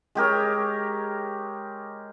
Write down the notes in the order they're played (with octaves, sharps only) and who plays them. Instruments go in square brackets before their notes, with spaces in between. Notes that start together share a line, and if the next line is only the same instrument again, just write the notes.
[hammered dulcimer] G#3 G4 A#4 C#5